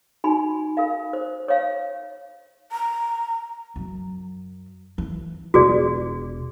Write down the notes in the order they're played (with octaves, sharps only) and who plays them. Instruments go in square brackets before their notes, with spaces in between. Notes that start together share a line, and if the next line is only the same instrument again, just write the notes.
[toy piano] D#4 F#4 G#5 B5 C6
A#4 F5
C5
C#5 F5
[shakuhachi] A#5
[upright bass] F#2
E3
[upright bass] E1 [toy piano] F#4 G#4 D5